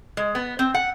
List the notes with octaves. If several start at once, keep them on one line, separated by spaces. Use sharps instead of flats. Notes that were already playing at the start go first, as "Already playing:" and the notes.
G#3
B3
C4
F#5